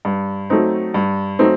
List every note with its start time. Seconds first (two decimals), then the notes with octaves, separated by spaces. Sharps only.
0.05 G2
0.50 F#3 A3 C4 D#4
0.94 G2
1.39 F#3 A3 C4 D#4